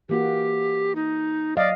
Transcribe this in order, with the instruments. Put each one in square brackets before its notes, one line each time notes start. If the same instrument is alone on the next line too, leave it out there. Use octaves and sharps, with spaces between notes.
[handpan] E3 A#3 F#4 [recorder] G4
[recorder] D#4
[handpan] F#3 D#5 F5 [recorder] D5